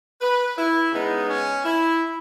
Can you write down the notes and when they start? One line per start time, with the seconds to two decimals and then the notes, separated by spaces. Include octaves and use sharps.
0.21 B4
0.56 E4
0.92 C#3 G#3 B3 D#4
1.27 C#4
1.63 E4